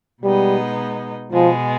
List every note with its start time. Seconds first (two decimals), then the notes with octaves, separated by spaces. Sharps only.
0.24 B2 G3 G#3 B3 D#4
1.32 B2 F3 G#3 B3